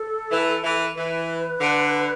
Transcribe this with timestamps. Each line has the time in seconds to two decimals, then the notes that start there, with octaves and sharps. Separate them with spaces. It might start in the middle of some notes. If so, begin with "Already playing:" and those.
Already playing: A4
0.31 E3
0.64 E3
0.96 E3 B4
1.60 D3